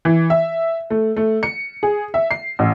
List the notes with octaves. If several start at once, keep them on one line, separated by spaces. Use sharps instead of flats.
E3
E5
A3
A3
C#7
G#4
E5
C7
A1